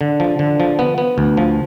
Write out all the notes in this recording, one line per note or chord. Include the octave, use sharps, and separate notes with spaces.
D3
F3
D3
F3
B3
B3
D2
F3